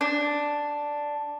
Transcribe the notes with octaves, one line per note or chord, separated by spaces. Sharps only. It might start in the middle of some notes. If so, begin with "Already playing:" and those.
D4